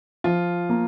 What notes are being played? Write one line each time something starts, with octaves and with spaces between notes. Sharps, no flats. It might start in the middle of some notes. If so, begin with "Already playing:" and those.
F3 F4
A#3